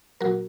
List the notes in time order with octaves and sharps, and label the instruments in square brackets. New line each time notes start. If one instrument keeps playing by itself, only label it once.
[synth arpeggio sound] A#2 F#3 F#4 A#4